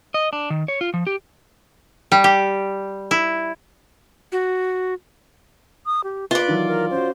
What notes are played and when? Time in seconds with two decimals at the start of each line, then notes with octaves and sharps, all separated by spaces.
0.14 D#5
0.33 D4
0.50 D#3
0.68 C#5
0.81 F4
0.94 F3
1.07 G4
2.12 G3
2.24 G4
3.11 E4
4.32 F#4
5.86 D#6
6.04 G4
6.31 F4 B4 D5
6.48 D#3 E3 F#3
6.67 A#4
6.91 C#4 F#4 C5